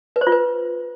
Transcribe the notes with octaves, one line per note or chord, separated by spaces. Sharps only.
B4
C5
F4
B4